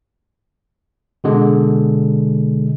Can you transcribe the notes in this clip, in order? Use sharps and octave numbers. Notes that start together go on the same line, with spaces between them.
B2 D3 G#3